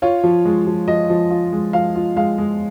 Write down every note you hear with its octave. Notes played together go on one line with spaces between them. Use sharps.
F4 C#5
F3
G#3
F3
F3 D#5
F3
F4
G#3
F3 F5
F4
G#3 F5
G#3